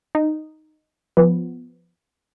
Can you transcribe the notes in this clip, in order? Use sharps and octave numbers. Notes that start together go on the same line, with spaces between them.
D#4
F3 B3